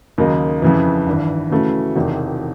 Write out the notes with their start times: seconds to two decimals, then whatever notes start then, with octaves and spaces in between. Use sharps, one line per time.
0.18 D#2 C#3 F#3 A#3 D#4
0.62 F2 C#3 E3
1.07 G#1 G2 E3
1.51 C#3 E3 A3 C#4 F#4
1.96 E1 E2 C3 D#3